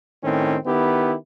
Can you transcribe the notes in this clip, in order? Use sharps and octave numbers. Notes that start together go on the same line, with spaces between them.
A2 D#3 C4 C#4
D#3 B3 E4 G4